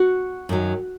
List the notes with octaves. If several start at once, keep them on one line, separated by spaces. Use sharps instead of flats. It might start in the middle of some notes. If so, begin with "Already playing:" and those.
Already playing: F#4 F#5
F#2 D#3 F#3